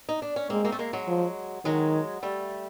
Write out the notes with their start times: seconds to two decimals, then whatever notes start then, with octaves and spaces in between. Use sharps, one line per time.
0.09 D#4
0.22 D4
0.36 C#4
0.50 G#3 A#3 C4
0.65 A#3 C4
0.72 A3
0.79 G#3 A#3
0.93 F#3 G#3
1.08 F3
1.65 D#3 F#3 G#3
2.23 G3 A3